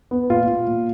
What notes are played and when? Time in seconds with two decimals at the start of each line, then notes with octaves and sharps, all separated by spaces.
0.11 B3
0.30 A#2 F4
0.48 A#2
0.67 A#2